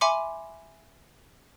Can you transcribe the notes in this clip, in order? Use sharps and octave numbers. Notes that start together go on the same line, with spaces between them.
E5 G#5 B5 C6 D6 C#7